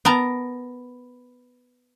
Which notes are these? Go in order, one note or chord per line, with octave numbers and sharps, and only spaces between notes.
B3 A#4 A5 A#5